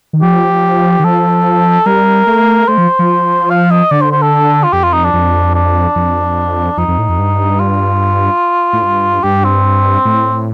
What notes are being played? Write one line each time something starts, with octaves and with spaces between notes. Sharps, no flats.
D#3
F3 G4
D#3
F3 A4
G3 A#4
A3
A3 C5
F3
F3
F5
D#5
D3 D5
C5
C5
A4
F4
F2 G4
F4
D#4
D4
F2
D4
F2
F2 D#4
F2
A2
F2
G2
F4
A2
G2
G2 G4
C4
A2